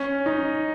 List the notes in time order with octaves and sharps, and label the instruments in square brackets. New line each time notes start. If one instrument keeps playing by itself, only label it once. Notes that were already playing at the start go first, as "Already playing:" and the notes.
Already playing: [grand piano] C#4
D#4